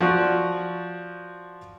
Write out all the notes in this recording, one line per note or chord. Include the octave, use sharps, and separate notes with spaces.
F3 F#4 D5 C#6 F#6